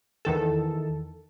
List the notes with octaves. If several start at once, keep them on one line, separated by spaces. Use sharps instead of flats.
E2 D#3 A4